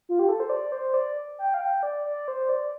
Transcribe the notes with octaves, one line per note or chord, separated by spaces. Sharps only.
F4
G4
A4
C5
D5
C5
D5
G5
F5
G5
D5
D5
C5
D5